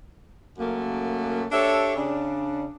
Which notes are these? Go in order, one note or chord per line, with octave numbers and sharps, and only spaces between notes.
F#2 C#3 A3 A#3
D4 G4 A4 C#5 E5
C#3 D4